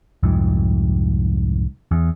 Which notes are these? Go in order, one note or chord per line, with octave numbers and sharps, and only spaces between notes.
C2 F2 G#2
E2